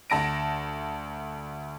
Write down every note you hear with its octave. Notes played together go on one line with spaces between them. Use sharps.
D2 A5 A#6 D7